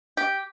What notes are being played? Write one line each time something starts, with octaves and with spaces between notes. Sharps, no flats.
G4